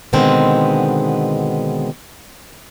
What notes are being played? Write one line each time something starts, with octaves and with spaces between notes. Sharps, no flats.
B2 D3 D#3 G#3 B3 C4